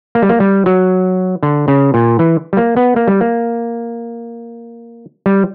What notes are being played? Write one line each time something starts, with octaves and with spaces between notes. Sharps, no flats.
A#3
G3
A#3
G3
F#3
D3
C#3
A#2
E3
G3
A#3
B3
A#3
G3
A#3
G3